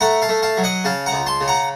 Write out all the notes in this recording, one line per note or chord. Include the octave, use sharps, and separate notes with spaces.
A3 F#5 A#5
F5 A5
A3
F5 A5
F#3
D#5 F#5
C#3 F5 A5
F#5 A#5
C#2
A5 C6
C#3
F#5 A#5